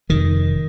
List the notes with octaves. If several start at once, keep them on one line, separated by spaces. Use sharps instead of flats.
F1 D#3